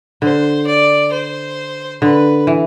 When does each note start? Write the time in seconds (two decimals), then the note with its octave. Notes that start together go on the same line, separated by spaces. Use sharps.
0.22 D3 C5
0.67 D5
1.12 C5
2.02 D3 B4
2.47 E3